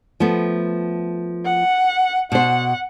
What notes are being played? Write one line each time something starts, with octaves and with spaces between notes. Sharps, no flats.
F3 A3 B3
F#5
B2 C5 F#5